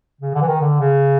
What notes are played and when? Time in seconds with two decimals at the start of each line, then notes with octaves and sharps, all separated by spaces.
0.21 C#3
0.34 D3
0.42 E3
0.47 D#3
0.61 D3
0.80 C#3